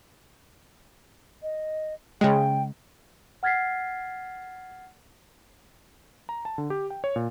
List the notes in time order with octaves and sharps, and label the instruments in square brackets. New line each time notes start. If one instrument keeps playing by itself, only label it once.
[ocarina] D#5
[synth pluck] C#3 G#3 [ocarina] G5
[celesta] F#5 F6 G#6 A6 B6 C7
[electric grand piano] A#5
A5
D3
G4
G5
C#5
A#2